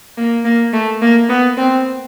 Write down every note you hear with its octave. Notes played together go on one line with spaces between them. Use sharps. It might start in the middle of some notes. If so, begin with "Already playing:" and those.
A#3
A#3
A3
A#3
B3
C4